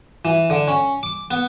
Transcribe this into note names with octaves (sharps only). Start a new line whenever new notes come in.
E3
D3
C#4
D6
B3